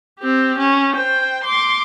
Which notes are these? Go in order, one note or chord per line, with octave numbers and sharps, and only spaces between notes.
C4 G4
C#4
C5 G5
C6 D6